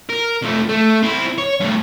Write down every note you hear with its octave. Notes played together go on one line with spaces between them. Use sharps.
A#4
F2 A3
A3
C4 E4
C#5
G2 A3